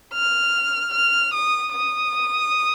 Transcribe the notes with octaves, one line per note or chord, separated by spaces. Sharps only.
F6
F6
D#6
D#6